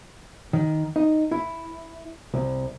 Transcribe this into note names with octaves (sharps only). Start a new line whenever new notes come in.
D#3
D#4
E4
C2